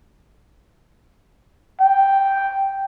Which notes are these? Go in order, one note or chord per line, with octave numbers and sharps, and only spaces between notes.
G5